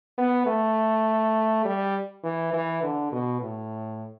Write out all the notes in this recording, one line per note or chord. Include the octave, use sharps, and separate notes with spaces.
B3
A3
G3
E3
E3
D3
B2
A2